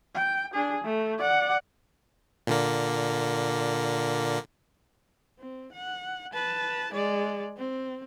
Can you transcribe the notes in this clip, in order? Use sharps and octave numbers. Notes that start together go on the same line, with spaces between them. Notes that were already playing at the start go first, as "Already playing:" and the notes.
G5
D4 G#4
A3
D5 F#5
A#2 D3 A#3
C4
F#5
B4 A5
G#3 D5
C4